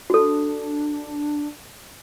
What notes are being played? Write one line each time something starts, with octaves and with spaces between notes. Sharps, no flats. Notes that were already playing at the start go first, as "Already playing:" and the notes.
D4 F#4 A4